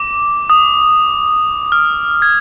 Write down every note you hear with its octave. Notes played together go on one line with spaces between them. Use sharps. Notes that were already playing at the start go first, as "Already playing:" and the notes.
Already playing: D6
D#6
F6
G#6